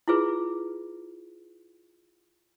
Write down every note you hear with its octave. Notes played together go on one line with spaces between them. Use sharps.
E4 F4 G#4 B4